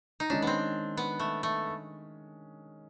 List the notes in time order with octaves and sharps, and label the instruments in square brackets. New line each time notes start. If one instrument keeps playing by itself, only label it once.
[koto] D#4
[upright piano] D#3 G#3 C#4 [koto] D4
[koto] B3 C4
B3
A3
A3